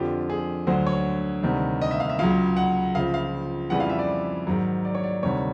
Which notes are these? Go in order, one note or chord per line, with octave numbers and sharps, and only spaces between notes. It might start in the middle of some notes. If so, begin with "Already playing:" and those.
Already playing: F2 D3 F3 G4
G#4
D2 D3 F#3 C5
C#5
D2 C3 D#3 G3
D#5
E5
F5
E5
C#2 C#3 F#3 F5
F#5
C#2 C#3 F3 F5
F5
F2 C#3 E3 G3 F#5
F5
E5
D5
G#2 D#3 F#3
D5
C#5
D5
D2 C3 D#3 G3 C#5